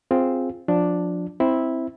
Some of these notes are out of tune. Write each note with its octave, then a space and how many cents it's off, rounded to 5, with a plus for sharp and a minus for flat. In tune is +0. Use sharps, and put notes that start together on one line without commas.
C4 +0 F4 +0 G#4 +0
F3 +25 D4 +0
C4 +0 E4 -10